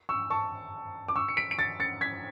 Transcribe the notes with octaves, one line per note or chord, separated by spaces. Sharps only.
C#6 E6
A5 C#6
D6
C#6 E6
C#7
B6 D7
D7
A6 C#7
A6 C#7
G#6 B6